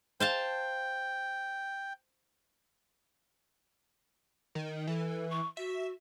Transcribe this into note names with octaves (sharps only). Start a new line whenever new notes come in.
C5 F5 G5 A5
D#3
E3 A4
C#6
F#4 E5